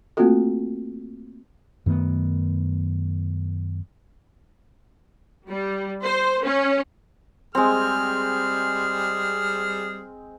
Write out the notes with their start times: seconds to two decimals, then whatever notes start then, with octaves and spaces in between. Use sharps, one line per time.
0.17 A3 A#3 C4 F4 F#4 A4
1.86 F#2 D#3 A3 B3
5.48 G3
6.03 C5
6.44 C#4
7.55 G3 G#3 C4 G#4 F6